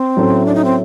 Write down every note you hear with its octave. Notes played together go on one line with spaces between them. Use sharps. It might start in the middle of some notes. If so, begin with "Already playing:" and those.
Already playing: C4
A2 F#3 A3 C#4
D4
D#4
C4